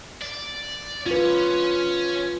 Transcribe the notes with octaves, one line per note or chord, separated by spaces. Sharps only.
D5
C#4 F4 B4